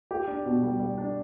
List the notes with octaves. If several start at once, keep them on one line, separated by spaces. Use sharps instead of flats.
G4
D4
B2
G3
G3
D4